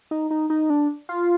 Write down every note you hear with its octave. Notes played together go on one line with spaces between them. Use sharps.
D#4
D#4
D#4
D4
F4